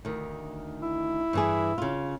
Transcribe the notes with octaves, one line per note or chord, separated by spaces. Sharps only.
D2 D#3
E4
G2 E3 G#4
C#3 F4